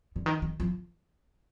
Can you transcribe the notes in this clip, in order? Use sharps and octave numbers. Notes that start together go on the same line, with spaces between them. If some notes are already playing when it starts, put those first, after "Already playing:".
D3
D#3
D#3
F3